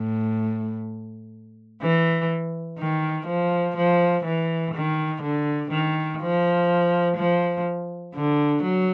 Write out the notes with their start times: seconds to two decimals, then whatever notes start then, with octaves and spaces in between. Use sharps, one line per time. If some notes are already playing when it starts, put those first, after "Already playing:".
Already playing: A2
1.82 E3
2.79 D#3
3.27 F3
3.77 F3
4.25 E3
4.75 D#3
5.22 D3
5.71 D#3
6.21 F3
7.17 F3
8.15 D3
8.63 F#3